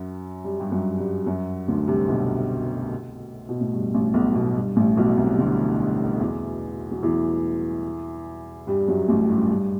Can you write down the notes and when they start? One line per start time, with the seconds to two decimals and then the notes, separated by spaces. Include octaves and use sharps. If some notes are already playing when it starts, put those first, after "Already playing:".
Already playing: F#2 F#3
0.44 G3
0.60 G2 G3
0.72 F#2 F#3
0.98 G2 G3
1.26 F#2 F#3
1.68 D2 D3
1.87 C2 C3
2.08 B1 B2
3.49 B2
3.61 A2
3.73 G2
3.94 A1 A2
4.14 B1 B2
4.35 B1 B2
4.55 G2
4.76 A1 A2
4.97 B1 B2
5.17 C2 C3
5.38 D2 D3
6.20 E2 E3
6.91 F#3
7.03 E2 E3
8.67 G2 G3
8.88 F#2 F#3
9.08 A1 A2
9.29 G2
9.49 G2